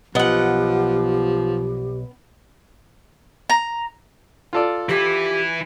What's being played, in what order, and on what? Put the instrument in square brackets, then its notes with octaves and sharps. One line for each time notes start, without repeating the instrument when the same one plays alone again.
[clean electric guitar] B1 D#5 [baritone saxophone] F3 [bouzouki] B3 F#5 [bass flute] G4
[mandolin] A#5
[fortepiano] F4 A4 D5
[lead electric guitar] E3 E4 [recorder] G4